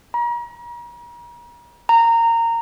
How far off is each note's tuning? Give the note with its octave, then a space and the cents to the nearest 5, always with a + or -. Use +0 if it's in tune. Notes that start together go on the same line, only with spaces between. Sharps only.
A#5 +40
A#5 -20